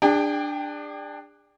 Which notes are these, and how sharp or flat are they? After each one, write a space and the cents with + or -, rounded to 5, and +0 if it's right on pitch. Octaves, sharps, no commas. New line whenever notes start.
D4 +10 G#4 -40 G5 +0